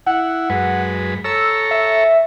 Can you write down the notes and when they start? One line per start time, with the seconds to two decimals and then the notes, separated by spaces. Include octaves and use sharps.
0.07 E4 F#5
0.50 F#2 G#3 B4
1.24 A4 C#5 A#5 E6
1.71 E5